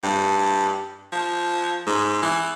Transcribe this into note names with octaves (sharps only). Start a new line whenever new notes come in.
G2
F3
G#2
E3